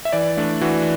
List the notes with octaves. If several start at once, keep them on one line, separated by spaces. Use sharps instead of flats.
E5
E3 D5
A3 D4
E3 F#4